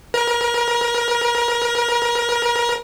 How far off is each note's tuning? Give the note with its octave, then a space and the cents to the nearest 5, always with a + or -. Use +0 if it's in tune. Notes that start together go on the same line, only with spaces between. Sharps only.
A#4 +30